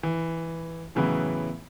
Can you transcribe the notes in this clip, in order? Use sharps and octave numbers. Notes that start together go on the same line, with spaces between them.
E3
A2 C#3 E3 F#3 B3 E4